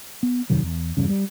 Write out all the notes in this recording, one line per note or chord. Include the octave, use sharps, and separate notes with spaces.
B3
F2 C3 D#3 F#3
E2
G1 E2 G2 C#3
G3